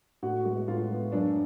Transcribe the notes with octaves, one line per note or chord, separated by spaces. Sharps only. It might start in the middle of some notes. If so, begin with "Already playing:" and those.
A2 F#4
G#3 B3
A2 F4
G#3 B3
F#2 D4